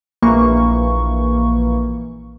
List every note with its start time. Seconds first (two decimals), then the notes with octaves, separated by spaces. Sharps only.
0.22 A#1 E3 A#3 C#6